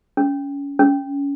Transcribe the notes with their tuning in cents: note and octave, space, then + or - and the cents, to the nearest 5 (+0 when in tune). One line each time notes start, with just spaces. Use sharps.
C#4 +25
C#4 +20